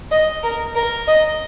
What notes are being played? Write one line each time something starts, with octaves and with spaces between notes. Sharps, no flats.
D#5
A#4
A#4
D#5